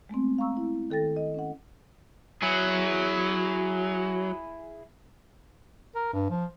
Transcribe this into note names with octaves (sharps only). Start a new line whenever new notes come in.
G#3 A3 B3 C4
F5 A#5 C#6 E6
E4
D#3 A4 G5 A6 A#6
D#5
C#4 F#5
F#3 E4 G#4
A#4
G2
F3